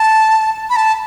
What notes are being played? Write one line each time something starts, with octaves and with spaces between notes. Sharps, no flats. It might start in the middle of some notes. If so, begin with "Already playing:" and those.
Already playing: A5
B5
A5